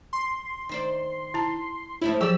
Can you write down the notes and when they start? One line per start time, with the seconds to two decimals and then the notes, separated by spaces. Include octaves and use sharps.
0.13 C6
0.69 D#3 C5 D5
1.34 E4 A5
2.02 F3 A3 C#4 E4
2.21 F3 F#3 G4 G#4 D5 E6